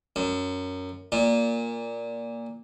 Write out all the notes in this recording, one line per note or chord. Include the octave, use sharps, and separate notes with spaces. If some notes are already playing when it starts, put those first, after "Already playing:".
F#2
A#2